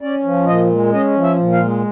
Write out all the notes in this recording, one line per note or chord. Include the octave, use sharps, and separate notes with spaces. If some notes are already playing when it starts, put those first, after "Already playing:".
C#4 D5
F3
A#2 D#5
G#3
C#4 D#5
F3
E5
A#2
F5
G#3